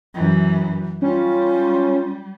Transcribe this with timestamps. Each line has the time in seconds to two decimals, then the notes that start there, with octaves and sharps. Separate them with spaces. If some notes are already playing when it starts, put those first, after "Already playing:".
0.14 F#2 E3
1.02 G3 C#4 F4